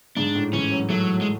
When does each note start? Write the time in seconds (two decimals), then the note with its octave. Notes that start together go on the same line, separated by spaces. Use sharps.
0.17 G#2 D4
0.35 A2
0.53 E3 C#4
0.71 F#3
0.90 F#3 A3
1.21 G#3